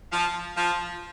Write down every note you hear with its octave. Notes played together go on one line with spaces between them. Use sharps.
F3
F3